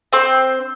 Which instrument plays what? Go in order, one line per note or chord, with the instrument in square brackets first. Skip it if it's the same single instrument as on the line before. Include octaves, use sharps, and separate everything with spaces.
[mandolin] C4 C5